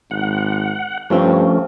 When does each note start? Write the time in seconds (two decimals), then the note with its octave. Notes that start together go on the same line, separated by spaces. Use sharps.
0.11 G#1 F#5
1.10 G2 F3 A3 C4 C#4 F4